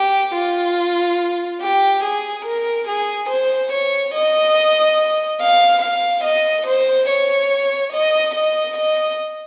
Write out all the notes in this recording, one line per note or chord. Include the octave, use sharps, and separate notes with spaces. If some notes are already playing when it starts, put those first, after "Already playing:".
Already playing: G4
F4
G4
G#4
A#4
G#4
C5
C#5
D#5
F5
F5
D#5
C5
C#5
D#5
D#5
D#5